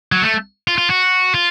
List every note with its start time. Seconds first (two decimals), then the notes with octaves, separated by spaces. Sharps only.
0.12 F#3
0.22 A3
0.68 F4
0.78 F4
0.90 F#4
1.34 F4